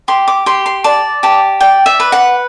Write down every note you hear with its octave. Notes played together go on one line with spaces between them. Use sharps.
G4 C6
D6
G4 C6
C6
D5 A5
G4 A5
D5 G5
E5
B4
F#5